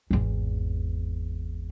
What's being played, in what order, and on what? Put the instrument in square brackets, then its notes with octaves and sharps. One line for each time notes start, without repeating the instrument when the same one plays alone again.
[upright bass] G#1 E2